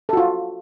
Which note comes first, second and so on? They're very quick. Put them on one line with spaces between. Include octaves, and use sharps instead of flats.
A4 F#4 F4